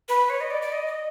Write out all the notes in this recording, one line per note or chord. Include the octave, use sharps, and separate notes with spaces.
B4
C#5
D#5
D5
D5
D#5
D#5